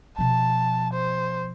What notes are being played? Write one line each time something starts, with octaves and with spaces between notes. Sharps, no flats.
B2 F3 A5
C5